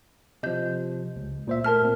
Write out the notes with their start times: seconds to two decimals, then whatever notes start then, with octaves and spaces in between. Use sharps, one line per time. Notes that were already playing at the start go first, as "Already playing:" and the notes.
0.43 C3 F3 D#5 G6
1.16 C#2
1.47 A#2 C5 E5
1.64 A3 A#4 A5 F6
1.82 A#2 C4